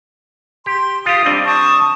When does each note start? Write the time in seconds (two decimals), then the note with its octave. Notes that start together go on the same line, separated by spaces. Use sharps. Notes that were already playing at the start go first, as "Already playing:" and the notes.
0.66 G4 C6
1.06 F4 G4 F5 D#6
1.25 G3 C4 D4 D#5
1.45 A5 C#6 D#6